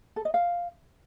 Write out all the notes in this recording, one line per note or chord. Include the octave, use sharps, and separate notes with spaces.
A4
D#5
F5